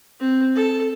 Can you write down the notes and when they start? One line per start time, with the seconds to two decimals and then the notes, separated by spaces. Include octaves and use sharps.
0.20 C4
0.55 A4